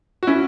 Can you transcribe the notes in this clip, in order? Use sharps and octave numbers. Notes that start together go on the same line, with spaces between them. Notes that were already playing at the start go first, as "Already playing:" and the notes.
F#4
C#4 E4